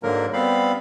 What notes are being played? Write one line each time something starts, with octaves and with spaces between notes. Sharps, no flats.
G#2 D3 F#3 A#3 A#4
G3 B3 C4 F5 B5